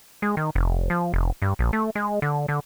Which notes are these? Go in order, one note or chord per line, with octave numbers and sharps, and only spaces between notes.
G#3
D#3
F1
F3
F1
G2
A#1
A3
G#3
D3
D3